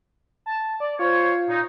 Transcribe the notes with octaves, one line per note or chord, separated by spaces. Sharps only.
A5
D5
F4 C5 C#5
A#2 D#4